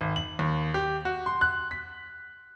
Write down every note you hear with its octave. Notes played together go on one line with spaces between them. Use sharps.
G#1
F#7
D#2
G4
F#4
C6
F#6
B6